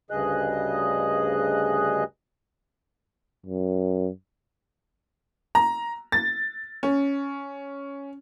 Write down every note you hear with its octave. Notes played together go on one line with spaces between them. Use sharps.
D2 G2 C#3 G#4 D#5 F#6
F#2
A#5
A6
C#4